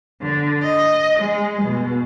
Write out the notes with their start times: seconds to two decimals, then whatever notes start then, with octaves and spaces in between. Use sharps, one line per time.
0.21 D3
0.63 D#5
1.19 G#3
1.64 B2